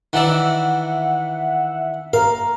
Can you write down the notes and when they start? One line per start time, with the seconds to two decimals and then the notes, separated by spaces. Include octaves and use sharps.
0.13 D#3 E3 D5 E5 F#5
2.13 A#4 F5